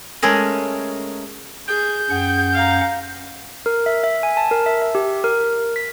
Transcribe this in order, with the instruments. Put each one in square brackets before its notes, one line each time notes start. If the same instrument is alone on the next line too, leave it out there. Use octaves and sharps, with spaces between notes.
[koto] G#3 A3 C#4 G#4 A#4
[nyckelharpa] G#4 [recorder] G6
[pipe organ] F#2 C#4 F#5 [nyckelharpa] G#4 G5
[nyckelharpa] F5 A#5
[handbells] A#4
E5
E5
G#5
A5
A#4
E5
E5
G4
A#4
B6